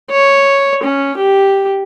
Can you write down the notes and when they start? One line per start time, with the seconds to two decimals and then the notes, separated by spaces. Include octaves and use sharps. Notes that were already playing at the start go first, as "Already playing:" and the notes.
0.11 C#5
0.84 C#4
1.17 G4